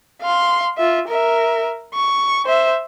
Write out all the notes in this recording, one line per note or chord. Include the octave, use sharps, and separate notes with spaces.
F5 C6
F4 E5
A#4 E5
C#6
C5 E5